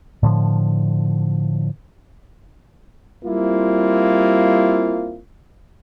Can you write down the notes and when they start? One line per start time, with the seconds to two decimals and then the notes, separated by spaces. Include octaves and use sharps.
0.23 A2 D3 F3
3.24 G3 A#3 C4 E4 F4